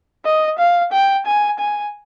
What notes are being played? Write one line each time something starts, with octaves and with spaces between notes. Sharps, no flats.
D#5
F5
G5
G#5
G#5